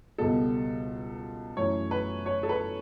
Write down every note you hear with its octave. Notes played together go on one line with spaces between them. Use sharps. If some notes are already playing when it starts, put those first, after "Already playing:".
C#2 B2 G3 B3 A4
F#2 E3 A3 C#5
B4
C#5
A4
B4